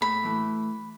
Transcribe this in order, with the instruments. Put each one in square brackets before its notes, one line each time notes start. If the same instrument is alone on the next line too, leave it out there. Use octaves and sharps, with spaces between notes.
[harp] A2 [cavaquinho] B5
[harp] E3 A3 E4